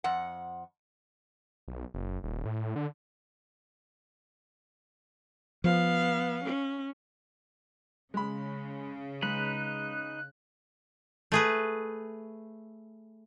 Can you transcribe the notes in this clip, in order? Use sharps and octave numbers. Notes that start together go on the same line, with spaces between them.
F2 F#5
B1
F#1
D#1
A2
D3
F3 B3 F5
C#4
C#3 G#3 B5
G#3 D#4 B4 B5 F#6
A3 G#4 B4